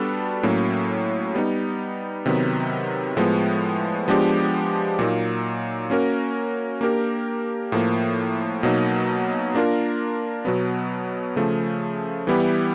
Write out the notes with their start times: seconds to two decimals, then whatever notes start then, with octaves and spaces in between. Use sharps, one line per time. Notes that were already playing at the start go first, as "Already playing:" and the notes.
Already playing: G3 B3 D4 F#4 A4
0.43 A2 F#3 A#3 C#4
1.35 G3 B3 D#4
2.26 C3 D#3 F#3 B3
3.17 A2 F3 G#3 B3
4.08 F3 G#3 B3 D4 G4
4.99 A#2 F#3 A#3 D#4
5.90 A#3 C#4 F#4 A#4
6.81 A#3 D4 G4 A#4
7.72 A2 F3 A#3
8.63 B2 F#3 A#3 D#4
9.55 A#3 D4 F4 A#4
10.45 B2 F#3 B3
11.36 C#3 F3 A3
12.27 E3 G3 B3 E4 G4